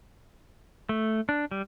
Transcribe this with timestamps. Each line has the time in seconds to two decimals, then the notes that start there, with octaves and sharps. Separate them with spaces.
0.89 A3
1.29 D4
1.51 G3